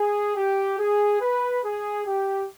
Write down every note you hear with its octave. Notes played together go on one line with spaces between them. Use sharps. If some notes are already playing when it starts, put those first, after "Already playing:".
Already playing: G#4
G4
G#4
B4
G#4
G4